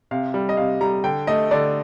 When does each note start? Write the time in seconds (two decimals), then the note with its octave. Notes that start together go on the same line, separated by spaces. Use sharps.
0.11 C3 F5
0.34 G3
0.49 D#5
0.57 C3 F5
0.81 G3 A#5
1.04 D3 G5
1.27 A3 D#5
1.51 D3 D5